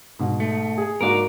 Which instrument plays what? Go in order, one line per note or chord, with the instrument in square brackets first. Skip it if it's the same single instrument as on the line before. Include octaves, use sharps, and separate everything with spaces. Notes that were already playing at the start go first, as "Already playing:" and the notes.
[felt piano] G#2 B2
[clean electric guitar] A3
[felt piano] G#4
[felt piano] G#2 A#3 F#4 [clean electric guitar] A#4 D5